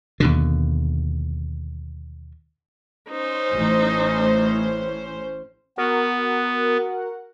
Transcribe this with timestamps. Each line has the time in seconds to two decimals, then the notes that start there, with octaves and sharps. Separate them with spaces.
0.20 D#2 B2 D3
3.10 C#4 D#4 C5
3.52 A1 A2 E3
5.78 B3 F#4 A#4 F#5